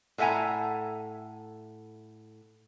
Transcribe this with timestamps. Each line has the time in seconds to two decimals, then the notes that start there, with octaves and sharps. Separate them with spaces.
0.18 A2 A4 E5 F#5 G#5 A#5